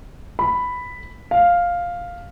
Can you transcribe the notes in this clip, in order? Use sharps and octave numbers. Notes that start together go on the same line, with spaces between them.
B5
F5